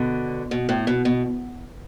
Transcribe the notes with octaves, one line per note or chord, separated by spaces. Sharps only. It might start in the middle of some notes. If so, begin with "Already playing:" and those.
Already playing: B2 D3
B2
A2
B2
B2